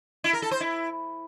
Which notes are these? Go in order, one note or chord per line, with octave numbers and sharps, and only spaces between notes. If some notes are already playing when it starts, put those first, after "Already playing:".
E4
A#4
A4
C5
E4